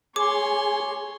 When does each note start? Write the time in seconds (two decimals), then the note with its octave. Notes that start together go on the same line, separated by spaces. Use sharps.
0.16 G#4 C#5 G#5 C6 D6